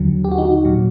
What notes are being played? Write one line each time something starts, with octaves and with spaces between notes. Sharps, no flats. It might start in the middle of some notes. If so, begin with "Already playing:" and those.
Already playing: D#2 D3 F#3
G4
F#4
D#4
F#4
A#2 F#3